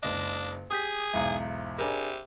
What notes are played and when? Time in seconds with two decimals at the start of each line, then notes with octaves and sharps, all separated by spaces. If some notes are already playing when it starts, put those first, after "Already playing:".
0.03 F#1 C#2 D4 D#5
0.71 G4 G#4 D#6 G6 B6
1.13 B1 E2 G#2 E5 F5 A#5
1.78 C3 D4 G#4 A#4 B5